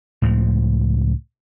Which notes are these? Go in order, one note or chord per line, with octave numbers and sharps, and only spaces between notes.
C#2 A2 C#3 F3